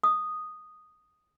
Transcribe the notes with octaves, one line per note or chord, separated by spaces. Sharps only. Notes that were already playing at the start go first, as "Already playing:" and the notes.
D#6